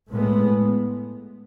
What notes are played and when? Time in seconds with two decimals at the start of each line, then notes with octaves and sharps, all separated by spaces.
0.10 A2 G#3 B3